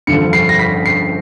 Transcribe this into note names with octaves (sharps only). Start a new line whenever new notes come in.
G2 D3 F3 C#7
C7
A#6
B6
C7